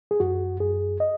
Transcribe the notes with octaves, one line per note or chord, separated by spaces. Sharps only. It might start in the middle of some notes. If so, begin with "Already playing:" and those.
G#4
F#2 F#4
F#2 G#4
D#5